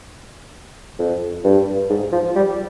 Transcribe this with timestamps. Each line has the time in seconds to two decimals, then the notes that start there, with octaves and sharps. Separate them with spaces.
0.99 F2
1.44 G2
1.90 G#2
2.12 F3
2.35 G3